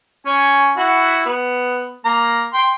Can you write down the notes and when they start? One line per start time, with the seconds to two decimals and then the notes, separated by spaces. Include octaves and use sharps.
0.26 C#4 G#5
0.76 E4 F#4 F#5
1.26 B3
2.05 A#3 A#5
2.54 G5 C6